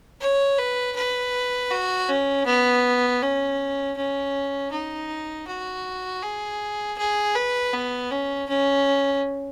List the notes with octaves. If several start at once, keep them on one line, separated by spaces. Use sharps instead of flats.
C#5
B4
B4
F#4
C#4
B3
C#4
C#4
D#4
F#4
G#4
G#4
B4
B3
C#4
C#4